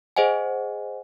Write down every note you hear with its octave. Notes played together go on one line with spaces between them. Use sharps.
G#4 C5 D#5 F#5 G#5